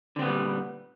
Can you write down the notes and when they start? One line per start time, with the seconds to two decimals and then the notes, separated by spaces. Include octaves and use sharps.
0.16 D3
0.19 C4
0.22 B3
0.25 A#2
0.28 G3